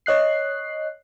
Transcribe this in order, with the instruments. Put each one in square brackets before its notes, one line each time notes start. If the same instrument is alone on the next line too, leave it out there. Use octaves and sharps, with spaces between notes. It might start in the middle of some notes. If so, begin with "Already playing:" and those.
[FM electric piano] C#5 D#5 F#6 C7